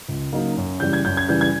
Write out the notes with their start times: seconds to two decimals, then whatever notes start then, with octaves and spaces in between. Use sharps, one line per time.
0.09 C#2
0.32 C#3 F#3 A#3 D#4
0.57 F#2
0.80 C#3 E3 G3 G6
0.93 G#6
1.05 F#2 G6
1.17 G#6
1.28 C#3 E3 G3 G6
1.41 G#6